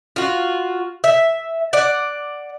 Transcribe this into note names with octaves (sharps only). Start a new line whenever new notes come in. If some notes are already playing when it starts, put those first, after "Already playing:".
F4 F#4
E5
D5 F#5